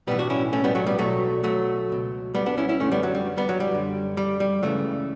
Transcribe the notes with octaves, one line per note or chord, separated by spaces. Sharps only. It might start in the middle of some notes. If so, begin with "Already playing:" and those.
B1 A2 E3 G3 B3
D4 F#4
C#4 E4
A3 C#4
G3 B3
F#3 A3
G3 B3
B1 B2 F#3 A3
F#3 A3
C#2 B2
G3 B3
B3 D4
C#4 E4
C#4 E4
F#2 D3 A3 C#4
G3 B3
F#3
G3
G3 B3
F#3
G3
F#2 D3
G3
G3
C#2 C#3 E3 F#3 A3